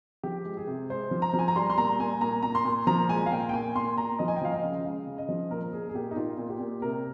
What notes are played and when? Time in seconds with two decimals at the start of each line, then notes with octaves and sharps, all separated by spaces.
0.23 F3 G4
0.45 G#3
0.57 G#4
0.67 C3
0.90 G#3 C5
1.11 F3
1.22 A#5
1.34 F3
1.39 G#5
1.48 A#5
1.56 G3 C6
1.70 C6
1.78 A#2 A#5
2.00 A#2 G#5
2.21 A#2 A#5
2.42 A#2 A#5
2.55 C6
2.65 A#2
2.87 F3 A#5
3.09 G#3 G#5
3.26 F5
3.32 A#2 G5
3.49 G5
3.54 A#2 G#5
3.76 A#2 C6
3.97 A#2 A#5
4.19 F3 D#5
4.28 G#5
4.36 G5
4.41 F3 F5
4.52 D#5
4.63 C#3
4.85 G#3 F5
5.07 C#3
5.18 D#5
5.29 F3
5.50 A#2 A#4
5.73 A#2 G#4
5.89 G#4
5.95 A#2 G4
6.11 D#4
6.16 A#2 F4
6.38 A#2
6.50 G4
6.60 A#2
6.82 C3 A#4